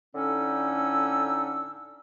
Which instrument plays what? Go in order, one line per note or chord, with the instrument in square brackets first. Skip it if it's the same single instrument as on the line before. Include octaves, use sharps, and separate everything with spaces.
[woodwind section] A2 D3 C#4 D#4 E6